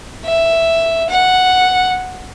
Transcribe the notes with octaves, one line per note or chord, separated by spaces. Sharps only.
E5
F#5